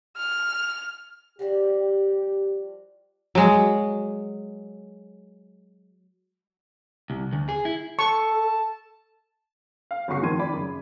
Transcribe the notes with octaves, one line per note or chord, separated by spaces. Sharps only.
F6
F3 G3 F#4 G4
F#3 G#3
C2
D2
G#4
E4
A4 A5 C#6
F5
G1 C#3 F#4 C#6 C7
F1 D#3 F3 C6 G#6 D#7
D#3 D5 B5
F#2 C#3